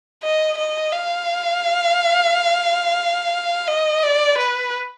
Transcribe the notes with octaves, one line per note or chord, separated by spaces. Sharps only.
D#5
D#5
F5
D#5
D5
B4